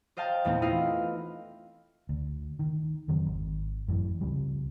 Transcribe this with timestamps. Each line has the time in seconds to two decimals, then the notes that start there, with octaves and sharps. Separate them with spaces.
0.17 C5 D#5 F5 G5 A5
0.45 E2 A#2 A3 B3 C4 D#4
0.62 C4 E4 F4 B4 D#5 F5
2.09 D2
2.59 D#3
3.08 F2 D#3 F#3 C4
3.26 G#1
3.88 F#2 A2 E3
4.21 C#2 C3 F3 G3